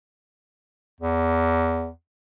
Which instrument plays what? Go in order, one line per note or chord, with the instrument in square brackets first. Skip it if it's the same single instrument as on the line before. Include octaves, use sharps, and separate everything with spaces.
[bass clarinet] E2